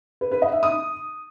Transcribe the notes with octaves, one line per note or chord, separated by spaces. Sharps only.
B4
B4
D#5
E5
D#6